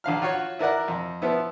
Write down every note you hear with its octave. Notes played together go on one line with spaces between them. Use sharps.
A#1 D3 F5 F6
F4 F#4 C#5
E4 A#4 D5 F#5
F2
F3 B3 E4